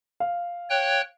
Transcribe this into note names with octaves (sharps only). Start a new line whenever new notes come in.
F5
C#5 G5 F#6